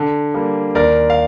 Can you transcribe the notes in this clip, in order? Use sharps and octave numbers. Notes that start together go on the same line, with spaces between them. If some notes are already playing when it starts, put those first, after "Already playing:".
Already playing: D3
G3 A#3
D#2 A#4 D5
F5